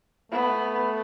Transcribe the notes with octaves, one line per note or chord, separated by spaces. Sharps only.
A3 B3